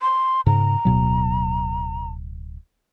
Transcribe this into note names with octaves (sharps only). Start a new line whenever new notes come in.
C6
G#2 C#3 A#5
D1 B2 F#3